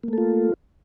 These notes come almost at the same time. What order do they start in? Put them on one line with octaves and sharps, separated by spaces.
A#3 A3 A4 F4